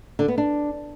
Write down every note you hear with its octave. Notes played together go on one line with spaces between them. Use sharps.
D3
B3
D4